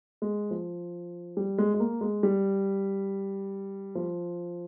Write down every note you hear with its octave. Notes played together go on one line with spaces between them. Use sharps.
G#3
F3
G3
G#3
G#3
A#3
G#3
G3
F3